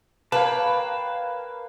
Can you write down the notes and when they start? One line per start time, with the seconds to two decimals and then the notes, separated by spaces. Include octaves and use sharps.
0.32 A#3 B4 C#5 F5 G5 A5